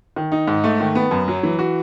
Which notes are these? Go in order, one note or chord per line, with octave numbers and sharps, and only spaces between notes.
D#3
D#4
G#2
A3
D#3
B3
F#2
F#3
E3
F#4